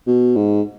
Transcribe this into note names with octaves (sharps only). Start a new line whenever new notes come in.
B2
G#2